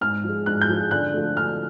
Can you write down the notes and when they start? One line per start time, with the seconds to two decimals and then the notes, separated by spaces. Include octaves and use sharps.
0.01 G#2 F6
0.24 F3
0.29 G#3
0.46 G#2 F#6
0.61 G6
0.69 F3 G#3
0.91 D3 F#6
1.14 F3 A3
1.37 D3 F6